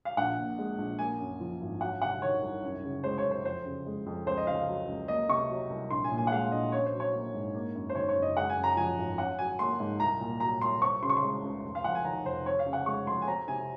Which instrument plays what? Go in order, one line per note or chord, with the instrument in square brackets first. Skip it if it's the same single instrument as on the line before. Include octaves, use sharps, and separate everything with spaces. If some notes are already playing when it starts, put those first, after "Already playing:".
[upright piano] F5
A#1 F#5
A#2
G#3
A#1
A#3 G#5
F#2
F3
G#1
F#3 F#5
C3 F#5
D#3 C#5
C2
F#2
C#3
G#3 C5
C#5
F#2
C5
F2 C5
C#3
G#3
F2
C#2 C5
D#5
C#3 F5
F#3
C#2
A#3 D#5
C3 C#6
F#3
C2
A#1 C6
G#5
A#2
G#5
F#5
G#3 F5
A#1 D#5
C#4 C#5
C5
F#3
C#5
A#3
G#2
A#3
F#2
C5
D#3 C#5
C#5
F#1
D#5
G#3 F#5
G#5
F#2
A#5
F3 G#5
G#1
C#4 F#5
F#3 G#5
A#3 C6
G#2
C2 A#5
A#2
F#3 A#5
C2 C6
C4 C#6
C#3 C6
C#6
C6
G#3
C#2
F1
F5
F2 F#5
G#5
D#3 A#5
F1 C5
C4 C#5
F5
C#3
F#5
G#3 C#6
F2 C6
G#5
C4 A#5
C3 G#5